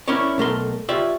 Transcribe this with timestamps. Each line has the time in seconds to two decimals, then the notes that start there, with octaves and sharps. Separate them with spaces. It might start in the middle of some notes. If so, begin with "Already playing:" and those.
0.08 C#4 E4 A#4 C#5 D5
0.38 B1 A3 A#4 C6
0.89 F4 G4 C#5 D5 E5